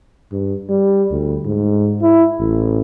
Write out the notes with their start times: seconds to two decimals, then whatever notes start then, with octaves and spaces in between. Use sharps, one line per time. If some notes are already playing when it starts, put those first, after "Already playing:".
0.32 G2
0.69 G3
1.11 D2
1.45 G#2
2.02 E4
2.40 A1